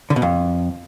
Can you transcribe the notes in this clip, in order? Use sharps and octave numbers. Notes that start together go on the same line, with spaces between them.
D3
B2
F2